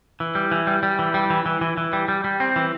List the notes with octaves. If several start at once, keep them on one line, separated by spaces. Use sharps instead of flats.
E3
G3
E3
G3
G3
E3
G3
E3
E3
E3
E3
G3
G3
G3
C4
E3